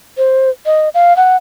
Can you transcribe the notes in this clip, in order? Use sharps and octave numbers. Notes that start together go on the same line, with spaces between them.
C5
D#5
F5
F#5